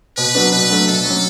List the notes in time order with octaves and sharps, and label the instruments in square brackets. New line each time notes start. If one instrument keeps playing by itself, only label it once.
[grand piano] B2 [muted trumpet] B4
[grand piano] F#3 B3 D4
[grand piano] B2 [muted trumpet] B4
[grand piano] F#3 A3 D4
[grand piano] B2 [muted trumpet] A4
[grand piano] F#3 C#4